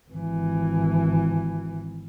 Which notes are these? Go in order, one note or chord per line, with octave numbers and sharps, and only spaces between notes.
G#1 E3